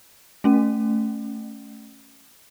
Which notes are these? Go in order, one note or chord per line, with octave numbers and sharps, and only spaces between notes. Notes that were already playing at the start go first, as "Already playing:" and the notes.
A3 C#4